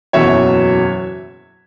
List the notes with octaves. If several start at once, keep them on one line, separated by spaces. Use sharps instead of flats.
F#1 E2 B2 F#3 C#5 E5